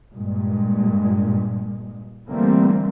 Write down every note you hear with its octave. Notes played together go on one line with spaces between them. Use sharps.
G2 A#2 G#3
D3 E3 G3 A3 A#3 C4